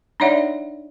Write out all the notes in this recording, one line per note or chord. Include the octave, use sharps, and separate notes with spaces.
D4 D#4 C#5 D5 E5 F#5